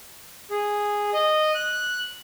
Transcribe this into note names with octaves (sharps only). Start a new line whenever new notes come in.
G#4
D#5
F#6